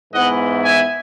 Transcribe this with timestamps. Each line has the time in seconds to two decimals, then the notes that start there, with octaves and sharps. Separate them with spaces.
0.12 G#2 E3 B3 E4 D#5 F#5
0.64 E5 G#5